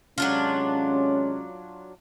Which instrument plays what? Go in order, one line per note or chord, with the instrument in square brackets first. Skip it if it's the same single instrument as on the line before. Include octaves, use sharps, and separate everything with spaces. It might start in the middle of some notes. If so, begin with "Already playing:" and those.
[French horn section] C3 G#3 C#4 [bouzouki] F#3 D4 F4